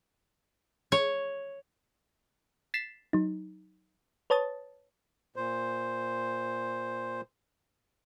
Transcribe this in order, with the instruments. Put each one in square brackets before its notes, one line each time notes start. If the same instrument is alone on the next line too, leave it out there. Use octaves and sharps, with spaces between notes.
[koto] C#5
[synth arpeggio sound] A6 B6 C7 E7
F#3 D#4
B4 C#5 A5 D#6 A6
[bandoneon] A#2 C5